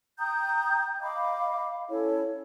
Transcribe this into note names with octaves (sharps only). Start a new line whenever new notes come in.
G5 A#5 D#6 G6
D#5 F5 B5 D6
C#4 E4 A4 C#5